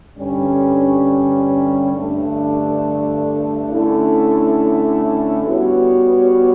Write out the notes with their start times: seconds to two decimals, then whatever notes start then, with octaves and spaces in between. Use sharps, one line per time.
0.17 G2 D3 G3 C#4
1.93 G2 D3 A3 D4
3.70 D3 A3 C#4 E4
5.45 G3 B3 F#4 C#5